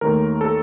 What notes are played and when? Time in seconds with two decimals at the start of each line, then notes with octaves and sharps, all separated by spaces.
0.01 D#2 D#3 A3 A#4
0.41 A4